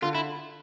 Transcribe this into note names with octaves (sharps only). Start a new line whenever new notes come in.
D3 F4
E4